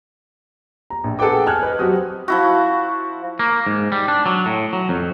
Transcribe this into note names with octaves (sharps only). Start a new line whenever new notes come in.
A#5
A#1
G#4 A4 B4 F#5 G5 D6
G#5 A5 F6 F#6 G#6
B4 D#5
F#3 C4 F#4 G4 D#6
F3 E4 F#4
A#3
G#2
G3
D4
F#3
A2
F#3
F2